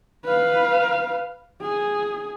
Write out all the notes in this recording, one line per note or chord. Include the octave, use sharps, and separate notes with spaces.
B4 F5
G#4